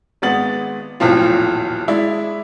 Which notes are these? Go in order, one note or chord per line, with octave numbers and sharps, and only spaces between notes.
G#1 G#3 B3 A6 F#7
D#1 B1 F2 A2 C4 F4
G#3 E4 D5 E5